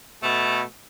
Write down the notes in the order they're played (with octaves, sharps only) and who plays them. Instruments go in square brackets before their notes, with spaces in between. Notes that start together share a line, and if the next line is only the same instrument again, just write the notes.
[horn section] B2 A3